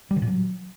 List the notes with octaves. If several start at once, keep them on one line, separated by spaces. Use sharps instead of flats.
G3
D3
A#2
F#3